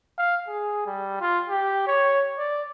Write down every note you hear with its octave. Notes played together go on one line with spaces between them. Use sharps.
F5
G#4
G3
F4
G4
C#5
D5